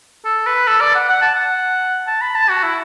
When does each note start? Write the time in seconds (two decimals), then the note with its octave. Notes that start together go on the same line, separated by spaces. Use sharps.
0.25 A4
0.46 B4
0.67 A4
0.81 D5
0.95 F#5
1.09 F#5
1.22 A5
1.35 F#5
2.07 A5
2.21 B5
2.35 A5
2.49 F#4
2.63 E4